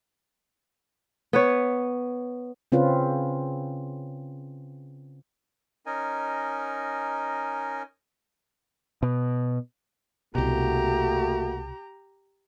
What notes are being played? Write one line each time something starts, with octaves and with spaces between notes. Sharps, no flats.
B3 B4 C#5
C#3 C4 C#4 F4 B4
C#4 D#4 A#4 D#5 G#5
B2
C2 B2 A3 A#3 F#4 G4 A#5